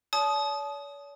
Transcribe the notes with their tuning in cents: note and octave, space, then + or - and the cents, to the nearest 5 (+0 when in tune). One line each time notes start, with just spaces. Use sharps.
C#5 +45 A5 -35 D#6 +0